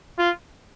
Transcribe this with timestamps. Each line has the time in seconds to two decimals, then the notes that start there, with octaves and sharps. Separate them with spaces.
0.18 F4